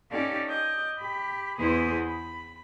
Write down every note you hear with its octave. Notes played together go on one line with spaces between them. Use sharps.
C#4 D#4 G4 A4 D5 F5
D#5 D6 G6
G4 B5
E2 E4 G#4 B4 C5 D#6
B5